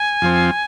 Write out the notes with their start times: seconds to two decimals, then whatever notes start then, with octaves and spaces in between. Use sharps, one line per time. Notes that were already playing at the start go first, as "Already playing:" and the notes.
Already playing: G#5
0.22 F2 F3 C4